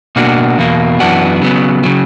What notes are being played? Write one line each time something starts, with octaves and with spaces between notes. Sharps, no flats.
B2 A#3 D4 F#4
E2 B2 A#3
F#2 E3 B3 D4 F#4
C#3 F#3 B3
C#3 F#3